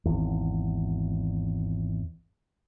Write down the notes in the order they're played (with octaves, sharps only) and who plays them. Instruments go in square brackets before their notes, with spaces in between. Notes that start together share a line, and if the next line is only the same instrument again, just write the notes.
[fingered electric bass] G#1 E2